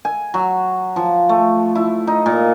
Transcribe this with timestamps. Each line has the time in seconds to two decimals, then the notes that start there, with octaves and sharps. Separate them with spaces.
0.05 G#5
0.34 F#3
0.96 F3
1.29 A3
1.75 E4
2.07 D#4
2.26 A#2